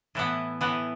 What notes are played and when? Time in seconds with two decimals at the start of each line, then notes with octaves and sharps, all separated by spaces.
0.15 A2 E3 B3
0.61 A2 E3 B3